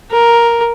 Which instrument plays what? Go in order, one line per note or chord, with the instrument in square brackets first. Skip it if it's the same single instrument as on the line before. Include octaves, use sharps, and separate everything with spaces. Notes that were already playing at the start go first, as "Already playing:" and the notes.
[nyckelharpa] A#4